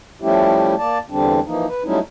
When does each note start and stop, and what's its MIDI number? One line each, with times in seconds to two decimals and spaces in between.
0.22 0.75 53
0.22 0.75 55
0.22 0.75 57
0.22 0.75 61
0.22 0.75 64
0.22 0.75 67
0.78 0.98 58
0.78 0.98 74
0.78 0.98 81
1.10 1.40 40
1.10 1.40 50
1.10 1.40 55
1.10 1.40 60
1.10 1.40 62
1.46 1.66 52
1.46 1.66 53
1.46 1.66 58
1.46 1.66 63
1.68 1.83 71
1.84 1.99 54
1.84 1.99 55
1.84 1.99 57
1.84 1.99 61
1.84 1.99 63
1.84 1.99 64